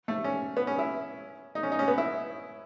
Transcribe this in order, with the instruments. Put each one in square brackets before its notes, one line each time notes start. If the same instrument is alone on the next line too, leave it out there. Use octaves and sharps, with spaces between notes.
[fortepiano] A3
C#4
B3
C#4
E4
D#4
C#4
D#4
C#4
B3
E4